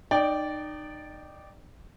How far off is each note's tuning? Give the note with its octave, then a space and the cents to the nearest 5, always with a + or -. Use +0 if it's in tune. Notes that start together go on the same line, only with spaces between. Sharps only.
D#4 -30 D5 -10 G5 +0